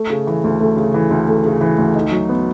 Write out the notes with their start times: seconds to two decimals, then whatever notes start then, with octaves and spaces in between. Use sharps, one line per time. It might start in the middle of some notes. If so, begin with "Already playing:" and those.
Already playing: A3
0.10 C#3
0.27 E3
0.44 D2
0.60 A3
0.77 C#3
0.94 E3
1.11 D2
1.28 A3
1.45 C#3
1.61 E3
1.78 D2
1.95 D#4
2.11 F#3
2.29 B3